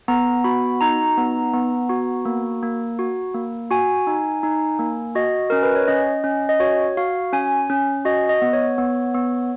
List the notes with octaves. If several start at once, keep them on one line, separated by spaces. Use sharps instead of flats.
B3 A#5
F#4 B5
D#4 A#5
B3
B3
F#4
A#3
A#3
F#4
A#3
F#4 G#5
D#4
D#4
A#3
F#4 D#5
C#4 A#4
B4
C#5
C#4 D#5
C#4
D#5
F#4 C#5
F#4 F5
C#4 G#5
C#4
F#4 D#5
D#5
B3
C#5
B3
B3